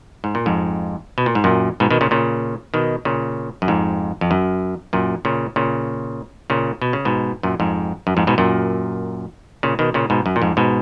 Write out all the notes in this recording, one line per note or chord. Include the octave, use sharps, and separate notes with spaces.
G#2
A#2
F2 G#2
B2
A#2
G#2
F#2 A#2
G#2 B2
B2 D#3
A#2 C#3
A#2 C#3
B2 D#3
A#2 C#3
F#2
F2 G#2
F2
F#2
F#2 A#2
A#2 C#3
A#2 C#3
A#2 C#3
B2
C#3
G#2 B2
F#2 A#2
F2 G#2
F#2
F2 G#2
G#2 B2
F#2 A#2
A#2 C#3
B2 D#3
A#2 C#3
G#2 B2
F#2
A#2
F2 G#2
G#2 B2